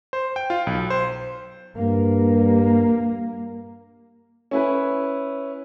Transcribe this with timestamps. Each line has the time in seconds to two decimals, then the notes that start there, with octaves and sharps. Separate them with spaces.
0.13 C5
0.36 G5
0.50 F4
0.67 B1
0.90 C5
1.79 G2 A#3
4.51 C#4 E4 B4